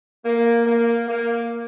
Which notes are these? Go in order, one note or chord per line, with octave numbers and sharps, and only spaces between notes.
A#3
A#3
A#3